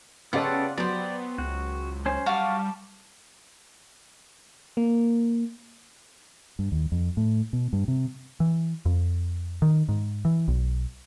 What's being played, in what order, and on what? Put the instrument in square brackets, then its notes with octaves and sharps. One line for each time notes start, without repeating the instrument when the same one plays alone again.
[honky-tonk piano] C#3 C#5 [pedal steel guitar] B3 G4 A4 [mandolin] F4 D5 F#5
[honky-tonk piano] F#3 [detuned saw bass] B3 [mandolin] G4 C5 [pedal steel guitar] D5
[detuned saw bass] C#2 [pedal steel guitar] F#4
[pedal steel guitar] C#4 C5
[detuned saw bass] G3 [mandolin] F4 F#4 F5 [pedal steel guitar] A5 D6
[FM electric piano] A#3
[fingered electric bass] G2
D#2
F2
A2
B2
G2
C3
[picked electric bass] E3
F2
D#3
G#2
E3
B1